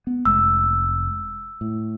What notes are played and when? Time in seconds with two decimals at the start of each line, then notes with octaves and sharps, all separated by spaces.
0.07 B3
0.25 F1 G#3 E6
1.61 A2